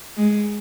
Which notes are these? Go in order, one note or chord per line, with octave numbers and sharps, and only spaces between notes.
G#3